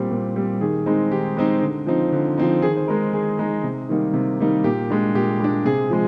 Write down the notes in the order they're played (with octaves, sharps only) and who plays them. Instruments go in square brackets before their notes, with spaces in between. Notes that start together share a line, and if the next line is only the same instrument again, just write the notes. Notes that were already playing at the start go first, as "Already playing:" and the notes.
Already playing: [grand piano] A#2 G3 C4 G4
A#2
G3 C4
D#3 G#4
G#3 C4 D#4
D#3 G4
G#3 C4 D#4
D3
F3 C4 D#4
D3
F3 C4 D#4
D#3 G#4
C5
G#3 D#4 A#4
D#3 G#4
G#3 D#4
C3
D#3 G3 A#3 D#4
C3
D#3 G3 A#3 D#4
A#2 G4
G#3 D4
A#2 G4
G#3 D4
C3 G#4
F3 G#3